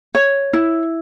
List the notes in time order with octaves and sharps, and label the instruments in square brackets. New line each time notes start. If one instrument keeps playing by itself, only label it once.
[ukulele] C#5
E4